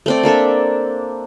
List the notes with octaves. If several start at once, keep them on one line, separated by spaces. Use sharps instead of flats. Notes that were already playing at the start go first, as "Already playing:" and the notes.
A3 C4 D5
A#3 D4 A4 E5